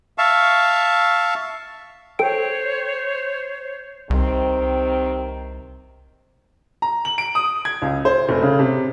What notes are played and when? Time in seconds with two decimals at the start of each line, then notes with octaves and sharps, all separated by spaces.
0.18 E5 F5 A5 C#6
2.19 A4 C5 C#5 G5 D7
4.10 C2 C3 D#3 C4
6.82 A#5
7.05 F#7
7.18 D7
7.35 D#6
7.65 G#6
7.82 C#2
8.05 C5
8.29 F1
8.42 C#3
8.59 C3